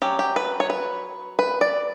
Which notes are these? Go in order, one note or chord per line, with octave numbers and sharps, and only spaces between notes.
F#3 C#4 G4
G4
B4
C#5
B4
B4
D5